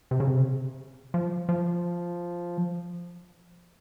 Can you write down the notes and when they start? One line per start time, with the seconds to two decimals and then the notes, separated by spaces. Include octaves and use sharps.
0.11 C3
0.20 C#3
0.28 C3
1.14 F3
1.49 F3